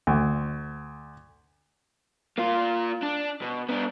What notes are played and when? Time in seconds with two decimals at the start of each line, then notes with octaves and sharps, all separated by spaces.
0.07 D2
2.38 A#3 F4
3.03 D4
3.42 B2
3.69 B3 D4